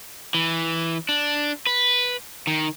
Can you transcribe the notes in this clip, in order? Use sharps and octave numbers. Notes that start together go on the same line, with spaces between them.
E3
D4
B4
D#3